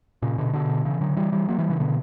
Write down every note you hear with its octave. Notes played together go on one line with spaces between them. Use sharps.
A#2 C#3
B2 D3
B2 D3
C#3 E3
D3 F#3
E3 G3
E3 G3
F#3 A#3
E3 G3
C#3 E3
B2 D3